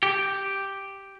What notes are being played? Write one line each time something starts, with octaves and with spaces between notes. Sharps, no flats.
G4